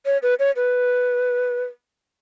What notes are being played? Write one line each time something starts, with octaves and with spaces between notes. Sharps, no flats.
C#5
B4
C#5
B4